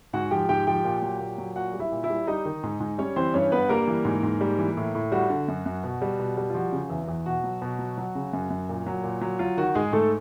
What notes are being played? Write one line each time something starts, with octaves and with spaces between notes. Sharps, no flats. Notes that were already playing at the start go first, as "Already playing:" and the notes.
G#2 F#4 F#5
F3 G4 G5
G#2 G4 G5
F3 G4 G5
A#2
F#3
A#2
F#3
A#2 F#4 F#5
G3
E4 E5
A#2
E4 E5
G3
G3 D#4 D#5
D#3
G#2
G#2
G3 C#4 C#5
E3 C4 C5
G2 C#4 C#5
G2 B3 B4
G3 A#3 A#4
E3
G#2
G#2
G3
E3
A2
A2
G3 F#4
D3
F#2
F#2
B2
G3
B2
G3
F4
F3 F#4
C#3
E2
E2
B2 F#4
F#3
B2
F#3
F#3
C#3
F#2
F#2
A#2
F#3
A#2
F#3
F#3 F4
D#3 F#4
G#2 G#3 G#4
G#2 A3 A4